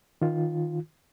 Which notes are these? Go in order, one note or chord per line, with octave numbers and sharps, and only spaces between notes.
D#3 F4